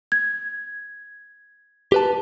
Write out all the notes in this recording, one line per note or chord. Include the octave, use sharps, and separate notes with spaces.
G#6
G4 B4 A5